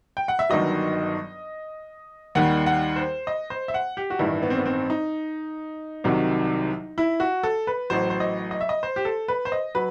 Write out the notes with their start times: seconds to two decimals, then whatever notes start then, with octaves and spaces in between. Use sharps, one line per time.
0.17 G5
0.28 F#5
0.39 E5
0.50 G1 G2 D#3 F#3 D#5
2.35 D#2 D#3 G3 F#5
2.66 F#5
2.96 C5
3.27 D#5
3.50 C5
3.68 E5
3.74 F#5
3.97 G4
4.10 F#4
4.19 A1 G2 D#3 E4
4.42 B3
4.50 C4
4.58 B3
4.66 C4
4.90 D#4
6.04 C2 C3 D#3 F#3
6.98 E4
7.20 F#4
7.43 A4
7.67 B4
7.90 A1 A2 F#3 C5
8.10 C5
8.20 D#5
8.51 D#5
8.61 E5
8.69 D#5
8.83 C5
8.96 G4
9.05 A4
9.28 B4
9.45 C5
9.52 D#5
9.75 F#3 B4